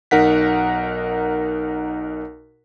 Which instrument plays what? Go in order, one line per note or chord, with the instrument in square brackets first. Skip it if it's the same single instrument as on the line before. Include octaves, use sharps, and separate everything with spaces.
[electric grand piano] B1 D#4 A#4 F#5 B6